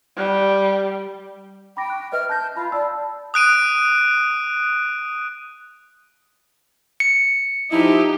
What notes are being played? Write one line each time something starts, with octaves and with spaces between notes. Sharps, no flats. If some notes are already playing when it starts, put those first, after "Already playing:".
G3
G5 B5 D6 A#6
C#6 F#6
B4 D#5 E5 F6
A5 F#6 G6 A#6
F4 A5 B5 F6
D5 A5 B5 E6
D#6 F#6 D7 D#7
C#7
F3 D#4 E4 G4